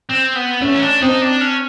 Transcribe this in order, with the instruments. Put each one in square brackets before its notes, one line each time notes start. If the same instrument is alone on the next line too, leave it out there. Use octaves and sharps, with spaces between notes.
[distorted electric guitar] C4
B3
[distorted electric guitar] A3 [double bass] C#4
[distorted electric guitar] C#4
D4
[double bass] C4 [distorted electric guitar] D#4
[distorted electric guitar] D4
C#4